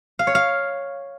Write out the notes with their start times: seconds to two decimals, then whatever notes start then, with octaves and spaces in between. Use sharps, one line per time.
0.19 F5
0.27 C#5
0.35 F5